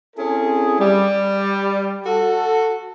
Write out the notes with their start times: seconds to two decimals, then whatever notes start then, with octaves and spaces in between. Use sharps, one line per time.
0.17 C4 C#4 E4 G#4 A4
0.79 G3
2.05 F#4 A4